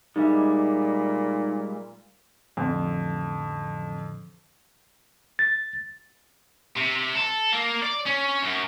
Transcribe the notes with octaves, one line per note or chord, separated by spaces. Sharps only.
A#2 G3 G#3 D#4 E5
A1 F2 D3 F3
A6
C3
A4
A#3
D5
C#4
F#2